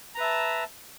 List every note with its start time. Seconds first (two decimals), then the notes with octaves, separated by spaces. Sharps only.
0.15 A#5
0.18 B4
0.20 E5
0.23 A5